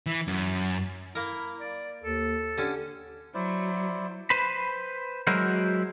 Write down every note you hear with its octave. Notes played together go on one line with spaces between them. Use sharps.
E3
F#2
A#3 E4 A#4
D5
D#2 A4
D3 C#4 G4
F#3 E4 C5 D5
B4 C5 B5
F#3 G#3 E4 F#4 A#4 C5